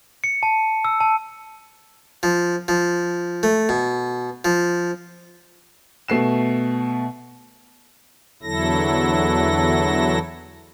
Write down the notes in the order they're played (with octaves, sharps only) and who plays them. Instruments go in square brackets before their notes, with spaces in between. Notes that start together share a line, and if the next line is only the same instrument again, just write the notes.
[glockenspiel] C#7
A5
E6
A5
[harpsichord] F3
F3
A3
B2
F3
[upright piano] B2 A3 C7 E7
[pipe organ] E2 D3 F#3 E4 A4 A#6